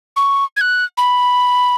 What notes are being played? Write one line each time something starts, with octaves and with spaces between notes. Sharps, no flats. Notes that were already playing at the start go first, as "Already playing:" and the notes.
C#6
G#6
F#6
B5